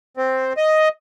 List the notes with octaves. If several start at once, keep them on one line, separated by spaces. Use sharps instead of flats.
C4
D#5